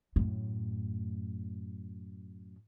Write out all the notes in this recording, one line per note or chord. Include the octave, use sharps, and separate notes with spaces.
F#2 A2